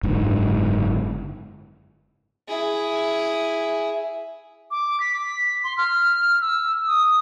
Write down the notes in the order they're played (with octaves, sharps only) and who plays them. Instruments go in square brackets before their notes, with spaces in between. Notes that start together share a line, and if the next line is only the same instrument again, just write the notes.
[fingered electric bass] F#1 G#2 D3
[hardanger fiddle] E4 G#4
[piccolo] D6
B6
C6
F6
E6
D#6